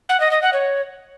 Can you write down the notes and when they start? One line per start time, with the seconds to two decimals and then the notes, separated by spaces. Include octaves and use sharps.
0.09 F#5
0.20 D#5
0.31 D#5
0.42 F#5
0.53 C#5